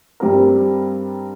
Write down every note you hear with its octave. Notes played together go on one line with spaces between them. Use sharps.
G2 G3 C4 G4 A#4